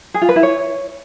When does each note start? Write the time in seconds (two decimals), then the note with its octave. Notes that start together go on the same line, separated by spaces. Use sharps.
0.14 G#4
0.22 F4
0.29 B4
0.36 E4
0.43 C#5